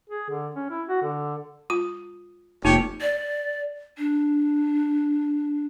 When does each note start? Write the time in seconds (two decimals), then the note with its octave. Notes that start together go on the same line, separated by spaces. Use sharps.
0.10 G#4
0.30 D3
0.55 C#4
0.70 E4
0.89 F#4
1.02 D3
1.70 F4 D#6
2.65 F1 A#3 D#4 F4 G4 C#5
3.01 D5
3.98 D4